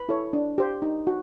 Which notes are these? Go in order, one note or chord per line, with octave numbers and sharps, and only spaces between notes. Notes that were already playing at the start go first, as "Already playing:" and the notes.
Already playing: B4 B5
E4 A4 C#5
D4
G4 C5
D#4
F#4